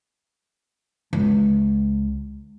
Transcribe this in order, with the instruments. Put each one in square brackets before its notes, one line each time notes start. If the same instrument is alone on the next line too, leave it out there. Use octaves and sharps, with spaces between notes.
[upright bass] C#2